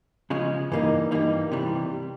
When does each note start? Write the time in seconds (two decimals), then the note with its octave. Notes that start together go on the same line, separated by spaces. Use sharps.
0.30 C#3 F3 G#3 C#4
0.71 G2 E3 G3 A#3 D#4
1.11 G2 E3 G3 A#3 D#4
1.52 C3 E3 G3